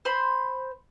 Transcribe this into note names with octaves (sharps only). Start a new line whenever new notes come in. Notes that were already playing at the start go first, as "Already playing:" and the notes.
C5 B5 C6